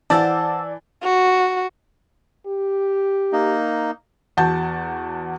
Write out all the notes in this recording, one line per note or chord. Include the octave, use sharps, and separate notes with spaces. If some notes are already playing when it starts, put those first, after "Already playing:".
E3 C5 D5 F5 F#5 A5 E6 A6
F#4
G4
A#3 D#4
E2 F#4 A5 G6